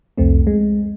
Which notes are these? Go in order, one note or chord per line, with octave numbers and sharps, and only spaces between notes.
C2 F2 A3 C4
G#3